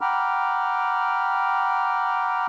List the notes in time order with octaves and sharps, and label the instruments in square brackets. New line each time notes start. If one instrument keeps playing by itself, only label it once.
[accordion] F#5 G5 A#5 B5 D6 F6